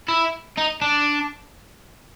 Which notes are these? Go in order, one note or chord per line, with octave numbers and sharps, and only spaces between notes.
E4
D#4
D4